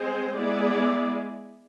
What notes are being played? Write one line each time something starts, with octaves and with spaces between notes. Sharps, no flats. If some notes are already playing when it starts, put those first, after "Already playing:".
Already playing: G#3 C4 G#4 C5
G#3 B3 E4 G#4 D5